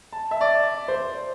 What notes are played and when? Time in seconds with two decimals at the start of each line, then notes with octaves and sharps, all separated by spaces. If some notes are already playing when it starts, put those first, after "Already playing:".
0.13 A5
0.31 E5
0.41 D5
0.88 C5